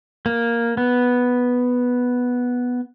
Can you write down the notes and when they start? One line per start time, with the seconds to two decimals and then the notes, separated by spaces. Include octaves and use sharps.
0.26 A#3
0.77 B3